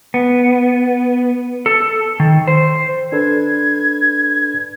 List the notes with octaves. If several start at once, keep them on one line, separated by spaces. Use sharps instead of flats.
B3
A4
D#3
C5
D4 A4 B4 G#6